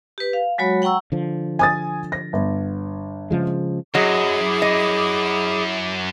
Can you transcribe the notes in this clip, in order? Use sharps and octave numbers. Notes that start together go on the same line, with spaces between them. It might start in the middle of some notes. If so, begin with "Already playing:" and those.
G4 B4
F5
F#3 G#3 F#4 C#5 B5
F#5 G5 A#5 C#6 E6
D3 F3
G#5 D#6 A6
A#6
G1
C#3 F3 G#3
F#2 F#3 E4 G#4 D#5 D6
D#5